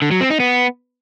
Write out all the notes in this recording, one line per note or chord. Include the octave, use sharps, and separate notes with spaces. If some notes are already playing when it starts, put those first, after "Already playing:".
D3
F#3
C4
D#4
B3